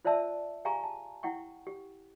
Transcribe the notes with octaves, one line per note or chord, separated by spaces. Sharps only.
F4 C5 D5 E5 A5 E6
G4 G#4 F5 G#5 A#5 C#6
A5
E4 F#5 G5 C#6
G4